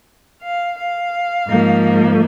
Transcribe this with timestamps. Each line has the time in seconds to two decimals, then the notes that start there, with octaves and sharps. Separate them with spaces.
0.43 F5
0.78 F5
1.48 G#2 F3 A#3